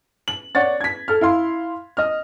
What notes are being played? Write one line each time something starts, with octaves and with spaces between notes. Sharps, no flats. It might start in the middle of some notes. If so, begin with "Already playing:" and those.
F#7
C#5 D5 F#5 A6
G#6 B6
A4 F6
E4 F5 C6
D#5 F6